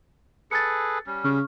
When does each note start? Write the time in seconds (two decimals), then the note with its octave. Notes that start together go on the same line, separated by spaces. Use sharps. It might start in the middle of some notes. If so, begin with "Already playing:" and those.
0.51 G#4 A4 B4 A6 C#7
1.07 G3 C#4
1.24 C#3 C#6 F6